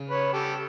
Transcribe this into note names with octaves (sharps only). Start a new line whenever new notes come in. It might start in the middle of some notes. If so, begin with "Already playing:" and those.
Already playing: C#3
B4 C#5
G4 A4